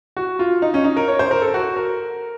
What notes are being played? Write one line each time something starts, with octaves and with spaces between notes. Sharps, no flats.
F#4
F4
D#4
C#4
D#4
A#4
C#5
C5
A#4
A4
F#4
A#4